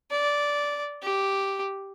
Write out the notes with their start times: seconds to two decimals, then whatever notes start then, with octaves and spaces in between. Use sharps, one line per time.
0.11 D5
1.02 G4